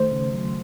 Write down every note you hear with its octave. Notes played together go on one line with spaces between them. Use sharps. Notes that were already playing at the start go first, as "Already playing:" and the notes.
Already playing: D#3 A3 C5
C#3
F#3